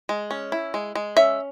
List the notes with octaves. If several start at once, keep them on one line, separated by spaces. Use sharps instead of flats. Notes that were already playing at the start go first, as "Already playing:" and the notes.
G#3
C#4
E4
G#3
G#3
C#4 E5